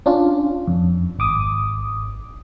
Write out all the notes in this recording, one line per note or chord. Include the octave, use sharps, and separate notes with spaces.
C#4 D4 F4
F2
G#1 D6 D#6